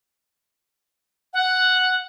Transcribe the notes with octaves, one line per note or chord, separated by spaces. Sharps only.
F#5